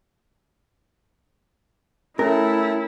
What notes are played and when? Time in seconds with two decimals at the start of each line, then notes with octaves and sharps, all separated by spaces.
2.19 A3 C#4 E4 A#4